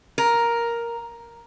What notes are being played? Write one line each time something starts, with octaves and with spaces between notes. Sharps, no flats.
A#4